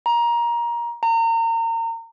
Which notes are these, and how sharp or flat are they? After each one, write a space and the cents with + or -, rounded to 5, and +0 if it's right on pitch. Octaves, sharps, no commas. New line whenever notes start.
A#5 +20
A#5 -30